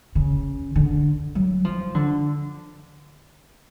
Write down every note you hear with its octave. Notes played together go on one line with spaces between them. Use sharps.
C#3
D3
F#3
F3
D3